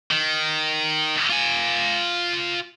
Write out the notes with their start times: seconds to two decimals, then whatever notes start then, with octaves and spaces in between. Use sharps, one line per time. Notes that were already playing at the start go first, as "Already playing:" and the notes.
0.11 D#3
1.30 F4 G#5